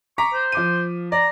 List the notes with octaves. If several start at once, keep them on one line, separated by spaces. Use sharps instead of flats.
A#5 C#6 D6 B6
C5
F3 D6 D#7
D5 A#5